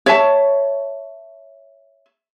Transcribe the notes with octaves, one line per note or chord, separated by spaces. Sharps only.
C#5 E5 A5